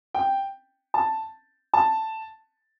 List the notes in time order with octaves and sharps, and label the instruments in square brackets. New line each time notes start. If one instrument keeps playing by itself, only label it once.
[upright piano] G5
A5
A5